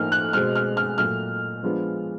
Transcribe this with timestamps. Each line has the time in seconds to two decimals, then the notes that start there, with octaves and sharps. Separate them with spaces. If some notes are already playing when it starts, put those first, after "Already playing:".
Already playing: A2 F3 A#3 D#4 F6
0.12 F#6
0.33 B2 G#3 C4 F6
0.55 F6
0.77 F6
0.98 A#2 F#3 A3 F6
1.63 F3 G#3 B3 D4 F4